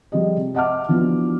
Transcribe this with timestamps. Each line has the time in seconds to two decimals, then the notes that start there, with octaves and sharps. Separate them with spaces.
0.12 F3 G3 G#3 D#5
0.36 C3
0.55 D#5 E5 F#5 A5 D6 F6
0.89 E3 F3 B3 D4 F4 F#4